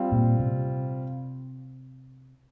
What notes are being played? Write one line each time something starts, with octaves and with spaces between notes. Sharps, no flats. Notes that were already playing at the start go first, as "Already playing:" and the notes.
Already playing: G3 C4 F4
A#2
C3